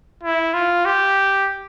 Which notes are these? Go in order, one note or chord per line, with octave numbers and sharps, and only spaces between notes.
E4
F4
G4